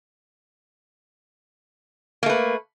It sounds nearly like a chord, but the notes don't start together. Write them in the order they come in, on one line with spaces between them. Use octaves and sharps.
A#3 A3 B4